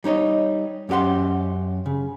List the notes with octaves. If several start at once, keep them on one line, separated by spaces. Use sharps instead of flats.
G3 D#4 C#5 D#5
F#2 C#4 G4 F#5 C6
C#3